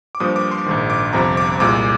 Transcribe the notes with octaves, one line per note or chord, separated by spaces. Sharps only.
D6
G2 F3 A#3 D#6
D6
C6
A#1 G#2 D#3
D6
G1 F2 C3 F3 A#5
D6
C2 A#2 G#3 D6